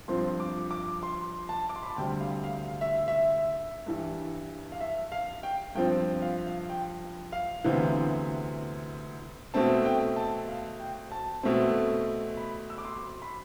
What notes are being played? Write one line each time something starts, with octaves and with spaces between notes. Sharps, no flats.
G2 F3 C4 C6
D6
D6
C6
A5
D6
C6
B5
A5
D2 C3 G3 G5
F5
F5
F5
E5
E5
G2 E3 G3
F5
E5
F5
G5
G2 F3 C4 G5
F5
F5
G5
F5
D2 C3 E3 B3
B2 A3 C4 A5
G5
A5
F5
G5
A5
B2 A3 C4
B5
E6
D6
C6
B5